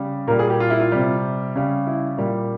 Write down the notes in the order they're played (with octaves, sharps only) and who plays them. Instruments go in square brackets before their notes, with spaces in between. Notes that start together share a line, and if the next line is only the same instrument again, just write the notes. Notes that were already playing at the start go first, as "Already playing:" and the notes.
Already playing: [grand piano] C#3 G3
A#2 A#4
G3
G#4
G4
F4
E4
F4
C3 G3
C#3 G3
E4
A#2 G3